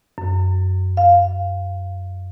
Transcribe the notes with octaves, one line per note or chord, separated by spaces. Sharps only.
F#2
F5